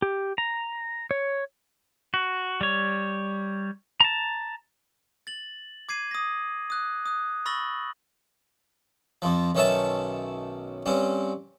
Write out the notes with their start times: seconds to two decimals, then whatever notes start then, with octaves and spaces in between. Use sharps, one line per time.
0.02 G4
0.38 A#5
1.11 C#5
2.14 F#4
2.61 G3 C#5
4.00 A5 A#5
5.27 A6 F#7
5.89 D6 G#6 C7 D#7
6.11 D#6 A#6
6.70 D#6 F#6
7.06 D#6 F#6
7.46 B5 C#6 E6 A6 A#6 F#7
9.22 F2 F3
9.55 B1 D#3 C#4 C#5 E5 A5
10.86 G2 C4 C#4